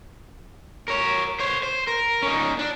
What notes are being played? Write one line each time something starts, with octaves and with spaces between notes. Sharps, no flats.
A#4 C#5
C5 C#5
C5
A#4
C#4 D#4
D4